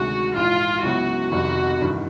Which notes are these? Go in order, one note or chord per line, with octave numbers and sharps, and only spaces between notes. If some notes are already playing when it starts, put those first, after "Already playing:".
Already playing: D2 C3 D#3 G#3 F#4
A#1 G#2 E3 F4
C#2 C#3 F#3 B3 E4 F#4
F1 F2 C3 D#3 G3 F#4
A1 G2 D#3